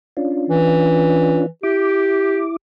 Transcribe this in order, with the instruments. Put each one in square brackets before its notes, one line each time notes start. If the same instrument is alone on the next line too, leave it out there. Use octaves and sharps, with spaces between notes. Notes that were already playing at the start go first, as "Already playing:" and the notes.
[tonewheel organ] C#4 D4 F4
[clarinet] E3
[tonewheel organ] E4 D6 [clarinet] G4